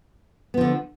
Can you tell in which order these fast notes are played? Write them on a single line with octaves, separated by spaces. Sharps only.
B3 F3 D3